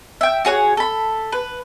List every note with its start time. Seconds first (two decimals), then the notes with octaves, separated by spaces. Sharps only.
0.21 E5 G5
0.45 F#4 G#4 C#5 F#5
0.77 A4 B5
1.32 B4